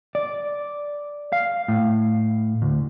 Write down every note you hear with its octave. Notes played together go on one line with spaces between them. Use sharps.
D5
F5
A2
D2